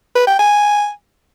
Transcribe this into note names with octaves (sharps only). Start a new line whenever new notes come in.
B4
G5
G#5